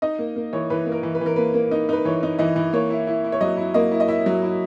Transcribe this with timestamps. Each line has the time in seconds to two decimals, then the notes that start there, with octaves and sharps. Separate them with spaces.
0.02 D#4 D#5
0.19 A#3
0.36 A#3
0.53 E3 C#5
0.70 E3 B4
0.86 A#3
0.92 A#4
1.03 E3
1.15 B4
1.21 E3 A#4
1.36 A#3 B4
1.54 A#3
1.71 D#4
1.89 D#4 B4
2.05 E3 C#5
2.23 D#4
2.39 E3 D#5
2.56 E3
2.73 A#3 C#5
2.91 E4
3.07 E4
3.24 E4
3.32 C#5
3.41 F#3 D#5
3.57 E4
3.74 A#3 D#5
3.91 E4
4.00 D#5
4.08 E4 E5
4.26 F#3
4.42 E4